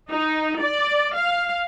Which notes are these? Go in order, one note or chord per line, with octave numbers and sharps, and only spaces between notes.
D#4
D5
F5